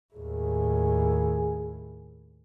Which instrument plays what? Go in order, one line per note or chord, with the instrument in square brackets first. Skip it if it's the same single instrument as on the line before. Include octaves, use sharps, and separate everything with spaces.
[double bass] D#2 A2 [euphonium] G#4